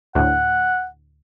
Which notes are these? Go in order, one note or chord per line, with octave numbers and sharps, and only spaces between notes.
D2 A2 F#5